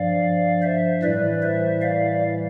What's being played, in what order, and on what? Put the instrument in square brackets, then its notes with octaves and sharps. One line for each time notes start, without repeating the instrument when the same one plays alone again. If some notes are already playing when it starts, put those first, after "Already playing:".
Already playing: [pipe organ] G2 F3 D5 F5
C5 E5
A2 E3 G3 B4 D5
C5 E5
D5 F5